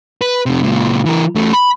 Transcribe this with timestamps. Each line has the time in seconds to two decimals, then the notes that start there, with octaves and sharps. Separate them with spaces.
0.22 B4
0.46 F2 C3
0.63 C#2 A#2
1.06 E3 A#4
1.35 E2 A3
1.53 B5